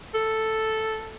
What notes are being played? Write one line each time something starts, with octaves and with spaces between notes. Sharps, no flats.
A4